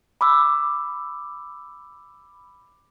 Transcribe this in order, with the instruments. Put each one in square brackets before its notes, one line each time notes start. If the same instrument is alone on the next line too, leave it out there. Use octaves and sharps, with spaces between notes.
[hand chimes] B5 D6 E6